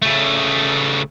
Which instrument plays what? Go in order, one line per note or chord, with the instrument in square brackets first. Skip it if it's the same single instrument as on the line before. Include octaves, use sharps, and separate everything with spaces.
[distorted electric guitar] C#3 A3